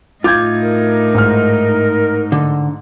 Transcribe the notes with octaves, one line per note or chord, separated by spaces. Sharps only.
A2 D#4 F4 D6 G6 G#6
A#4
G#2 F6
D3